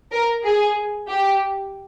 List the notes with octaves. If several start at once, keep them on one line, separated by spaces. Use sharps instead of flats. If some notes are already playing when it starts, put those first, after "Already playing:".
A#4
G#4
G4